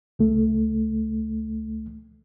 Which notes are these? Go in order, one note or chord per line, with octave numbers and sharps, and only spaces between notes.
C#2 A3